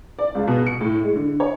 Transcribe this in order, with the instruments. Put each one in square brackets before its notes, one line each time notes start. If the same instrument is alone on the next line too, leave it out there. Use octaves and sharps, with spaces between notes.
[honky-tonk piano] D5
C#2
B2
C#7
A2
G#3
D3
C#5